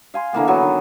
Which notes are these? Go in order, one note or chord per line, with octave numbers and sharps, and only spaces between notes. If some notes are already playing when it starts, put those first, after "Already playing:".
F5 G#5 C6
D3 E3 A#3 B3
F#3 B3
D#3